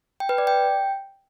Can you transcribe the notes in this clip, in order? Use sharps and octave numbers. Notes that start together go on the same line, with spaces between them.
G5
B4
D5
G5